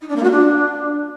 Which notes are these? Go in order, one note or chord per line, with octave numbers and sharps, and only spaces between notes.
D#4
D4
A#3
F#4
D4